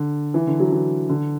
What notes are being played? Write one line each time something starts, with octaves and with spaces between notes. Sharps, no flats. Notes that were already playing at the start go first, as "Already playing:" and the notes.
Already playing: D3
E3
D3
F#3
E3
D3